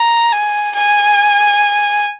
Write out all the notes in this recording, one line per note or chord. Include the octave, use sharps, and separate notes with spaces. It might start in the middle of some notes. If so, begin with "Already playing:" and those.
Already playing: A#5
G#5
G#5